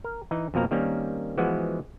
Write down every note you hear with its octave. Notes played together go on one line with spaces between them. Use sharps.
A#4
E3 D#4
F2 B2 F3 A#3 A#5
D#3 G3 A#3 C4 C#4
E3 F3 G#3 B3 F#4